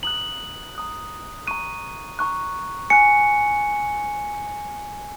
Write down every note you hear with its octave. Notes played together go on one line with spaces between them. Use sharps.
A#5 D#6 F#6 F#7
A#5 D#6 F#6
A#5 C#6 F#6 D#7
A#5 C#6 F#6
G#5 F#6 C#7